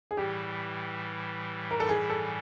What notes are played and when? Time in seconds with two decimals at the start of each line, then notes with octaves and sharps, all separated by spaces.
0.11 G#4
0.17 A2 E3 G3 G4
1.71 A#4
1.80 A4
1.89 G#4
2.10 A4